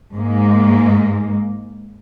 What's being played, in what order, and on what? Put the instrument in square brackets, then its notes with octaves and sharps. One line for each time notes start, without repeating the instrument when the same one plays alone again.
[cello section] G#2 G#3 A#3